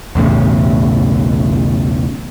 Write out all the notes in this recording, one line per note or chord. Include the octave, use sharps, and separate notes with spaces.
B1 E2 A2 C#3